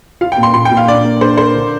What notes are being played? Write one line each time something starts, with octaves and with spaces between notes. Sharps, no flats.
F4 F5
G5
A#2
C6
A#2 C6
G5
A#2
F5
D4 D5
A#3
D4 C5
A#4 C5
D3